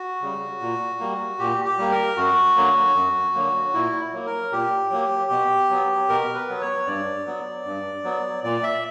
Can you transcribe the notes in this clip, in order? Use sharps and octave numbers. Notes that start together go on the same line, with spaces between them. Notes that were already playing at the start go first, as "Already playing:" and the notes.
Already playing: F#4
C#3 G3
A#2
G3 A#3
A#2 G4
G4
G3 A#3
A#4
F#2 F#4
D3 F#3 A#3
F#2
D3 F#3 A#3
A#2 E4
F#3 A#3
A#4
A#2 G4
F#3 A#3
B2
F#3 B3
B2 A#4
B4
F#3 B3
C#5
G2 D5
F#3 B3
G2
F#3 B3
A#2 D5
E5